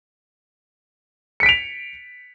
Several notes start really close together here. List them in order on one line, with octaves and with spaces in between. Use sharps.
C#7 B6 D7 F7